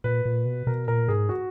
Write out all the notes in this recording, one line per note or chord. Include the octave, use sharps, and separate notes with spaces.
A#2 B4
A#2
B2
B2 A#4
A#2 A#4
G#2 G#4
F#4